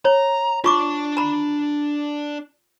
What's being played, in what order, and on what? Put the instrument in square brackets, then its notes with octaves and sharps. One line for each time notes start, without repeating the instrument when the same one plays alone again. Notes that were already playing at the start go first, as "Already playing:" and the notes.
[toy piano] C#5 [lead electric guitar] A#5
[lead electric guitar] D4 A5 [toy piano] F4 C#6 D6
[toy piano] A#5 B5